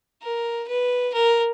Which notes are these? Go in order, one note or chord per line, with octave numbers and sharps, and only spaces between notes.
A#4
B4
A#4